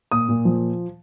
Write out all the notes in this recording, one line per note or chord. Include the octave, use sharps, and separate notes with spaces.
A#2 D#6
A#2
F3